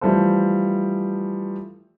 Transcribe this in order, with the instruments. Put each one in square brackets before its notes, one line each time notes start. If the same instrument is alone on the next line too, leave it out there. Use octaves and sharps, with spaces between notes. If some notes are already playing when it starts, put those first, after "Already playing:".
[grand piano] E3 F3 G3 A3 A4 C5